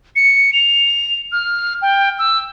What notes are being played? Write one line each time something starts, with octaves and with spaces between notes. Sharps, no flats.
C#7
F7
F6
G5
E6